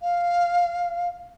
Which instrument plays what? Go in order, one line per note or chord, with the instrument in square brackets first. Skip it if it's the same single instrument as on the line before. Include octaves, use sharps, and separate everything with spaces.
[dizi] F5